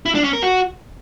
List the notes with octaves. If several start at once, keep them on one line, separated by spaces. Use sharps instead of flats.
E4
D4
C#4
A#4
F#4